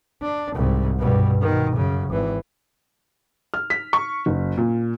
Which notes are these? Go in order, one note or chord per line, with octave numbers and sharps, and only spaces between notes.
D4
C2 G#2
G2 B2
B2 D#3
F#2 C#3
G#1 E3
F6
B6
C#6
F#1
A#2